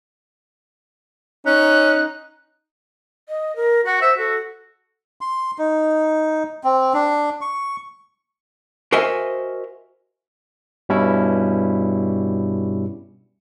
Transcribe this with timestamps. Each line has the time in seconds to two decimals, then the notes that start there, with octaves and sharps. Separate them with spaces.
1.46 C#4 D#4 F#6
3.29 D#5
3.56 A#4
3.86 F#4 F#5
4.01 C5 E5
4.18 F#4 A4
5.21 C6
5.58 D#4
6.64 C4
6.94 D4
7.41 C#6
8.92 F#4 A#4 C5 D#5 E5 G#5
10.89 G2 B2 G3 C#4 E4